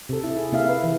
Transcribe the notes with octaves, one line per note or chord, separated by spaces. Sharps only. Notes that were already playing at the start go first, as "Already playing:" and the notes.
C3 A4
E4
G#4
C3 A#3 E4 E5 F5
B4 F5
E3